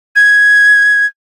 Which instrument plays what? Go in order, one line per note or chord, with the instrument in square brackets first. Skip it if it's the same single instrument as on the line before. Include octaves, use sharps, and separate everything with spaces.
[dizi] G#6